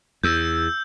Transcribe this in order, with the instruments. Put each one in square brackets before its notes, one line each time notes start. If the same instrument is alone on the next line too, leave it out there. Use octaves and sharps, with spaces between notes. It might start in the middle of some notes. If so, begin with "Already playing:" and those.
[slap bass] E2 [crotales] E6 G6